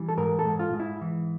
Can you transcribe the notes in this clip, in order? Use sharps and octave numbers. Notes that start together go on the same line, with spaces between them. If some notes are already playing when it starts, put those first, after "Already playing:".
Already playing: E3 G3
A4
G#2 A#4
A4
G#2
F4
G#2
E4
E3